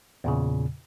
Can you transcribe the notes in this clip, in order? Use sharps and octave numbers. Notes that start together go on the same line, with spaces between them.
E2 A#2 C#3